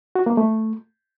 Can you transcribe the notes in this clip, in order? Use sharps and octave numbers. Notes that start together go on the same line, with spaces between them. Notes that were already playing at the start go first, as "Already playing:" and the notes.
F#4
A#3
A3